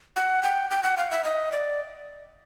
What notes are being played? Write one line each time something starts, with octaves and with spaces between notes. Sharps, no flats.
F#5
G5
G5
F#5
F5
E5
D#5
D5